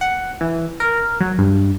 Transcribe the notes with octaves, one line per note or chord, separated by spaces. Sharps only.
F#5
E3
A#4
F#3
G2